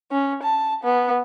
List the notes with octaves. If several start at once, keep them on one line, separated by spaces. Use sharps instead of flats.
C#4
A5
B3